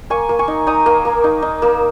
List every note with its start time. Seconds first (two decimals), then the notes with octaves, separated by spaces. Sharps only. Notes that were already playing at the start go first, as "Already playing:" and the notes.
0.10 A#3 G#5 C#6
0.29 A#3
0.39 G#5 C#6
0.48 D#4
0.67 D#4 A#5 D#6
0.86 A#3
1.05 A#3
1.24 D#4
1.42 D#4
1.62 A#3